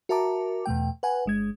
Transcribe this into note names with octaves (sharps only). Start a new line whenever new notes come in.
F#4 A#4 E5 A5 A#5 D6
E2 B2 A3 G5
B4 F#5 G#5
G1 G#3 G#6